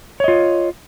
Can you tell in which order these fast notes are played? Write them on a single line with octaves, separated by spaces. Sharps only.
C#5 D#5 F4